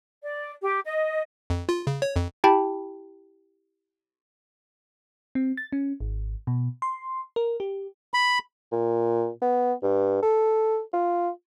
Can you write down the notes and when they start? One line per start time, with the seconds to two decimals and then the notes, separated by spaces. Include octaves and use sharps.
0.22 D5
0.61 G4
0.85 D#5
1.50 F2
1.69 F4
1.87 C#3
2.02 C#5
2.16 F2
2.44 E4 G4 G5 A5 B5
5.35 C4
5.57 A6
5.72 C#4
6.00 G#1
6.47 B2
6.82 C6
7.36 A#4
7.60 G4
8.14 B5
8.72 A#2
9.42 B3
9.83 G2
10.23 A4
10.94 F4